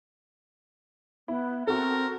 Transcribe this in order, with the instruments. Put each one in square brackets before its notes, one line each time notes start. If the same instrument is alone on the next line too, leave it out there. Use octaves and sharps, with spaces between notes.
[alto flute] B3 [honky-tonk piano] E4
[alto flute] C4 [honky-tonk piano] F#4 A4 [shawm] A#4